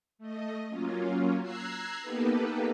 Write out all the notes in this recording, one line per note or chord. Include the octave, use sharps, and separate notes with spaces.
A3 D#5
F#3 A#3 C#4 F4
A#5 E6 F#6 G#6 C7
A#3 B3 D#4 G4 A4 B4